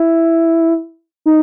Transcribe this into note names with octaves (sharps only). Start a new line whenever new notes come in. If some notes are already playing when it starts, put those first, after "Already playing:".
Already playing: E4
D#4